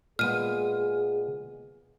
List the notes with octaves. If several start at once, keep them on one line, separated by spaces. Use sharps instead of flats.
A#2 G#3 B3 G#4 F6 D#7